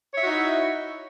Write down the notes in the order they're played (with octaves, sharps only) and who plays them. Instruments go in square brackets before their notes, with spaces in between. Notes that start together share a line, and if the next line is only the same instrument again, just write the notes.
[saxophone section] C#5
E5
F#4
D#4
E4